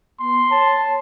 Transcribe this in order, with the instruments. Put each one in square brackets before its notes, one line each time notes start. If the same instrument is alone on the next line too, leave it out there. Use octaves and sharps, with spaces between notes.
[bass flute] B3 [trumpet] C6
[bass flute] C#5 [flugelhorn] A5